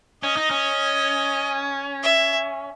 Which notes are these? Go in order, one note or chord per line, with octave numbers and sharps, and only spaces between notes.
C#4 D#5
D#4
C#4
E5